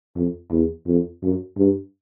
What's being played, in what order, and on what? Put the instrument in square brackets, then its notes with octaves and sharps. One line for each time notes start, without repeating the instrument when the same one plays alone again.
[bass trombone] F2
E2
F2
F#2
G2